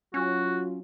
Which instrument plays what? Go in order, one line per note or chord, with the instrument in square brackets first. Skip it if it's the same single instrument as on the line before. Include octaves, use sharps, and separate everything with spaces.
[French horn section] F#3 F4 [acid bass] C#4 [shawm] F#4